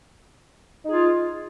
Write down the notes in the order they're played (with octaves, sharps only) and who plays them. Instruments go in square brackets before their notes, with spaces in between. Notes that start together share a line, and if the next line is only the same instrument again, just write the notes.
[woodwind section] D#4
G#4
F4